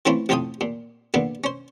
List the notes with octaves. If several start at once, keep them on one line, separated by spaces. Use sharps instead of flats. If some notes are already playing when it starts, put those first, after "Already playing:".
E3 A3 C4 C#4 E4 F4
A1 F2 A2 F4 G5 D#6
A#2
A#2 D3 A#3 B3
C#4 C5